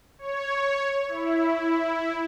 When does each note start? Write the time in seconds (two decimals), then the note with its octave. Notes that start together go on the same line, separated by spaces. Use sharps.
0.19 C#5
1.08 E4